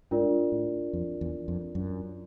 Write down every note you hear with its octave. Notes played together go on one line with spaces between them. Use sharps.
G#2 D4 F4 A#4 D5
A2
F2
E2
F2
F#2